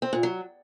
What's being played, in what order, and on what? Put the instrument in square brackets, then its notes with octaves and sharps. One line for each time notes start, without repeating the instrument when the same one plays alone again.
[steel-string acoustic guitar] C4
A#2
F#3